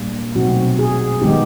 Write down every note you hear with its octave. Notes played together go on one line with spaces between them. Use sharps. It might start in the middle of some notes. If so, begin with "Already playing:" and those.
Already playing: A#2 G3 A#3 D4
B2 F#3 A3 C4 D#4 F#4
G#4
D#3 G#3 B3 D#4 G4